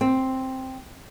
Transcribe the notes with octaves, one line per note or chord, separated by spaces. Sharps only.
C4